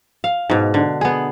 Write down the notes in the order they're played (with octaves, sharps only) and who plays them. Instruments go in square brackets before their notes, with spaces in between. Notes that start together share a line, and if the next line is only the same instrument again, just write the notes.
[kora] F5
G#2 B2
D3
B3 G#4